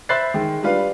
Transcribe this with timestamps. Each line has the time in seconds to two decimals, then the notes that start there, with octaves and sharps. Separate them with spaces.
0.09 C5 E5 B5 F#6 A6 C7
0.34 D#3 G#3
0.63 G3 D4 F4 B4 F5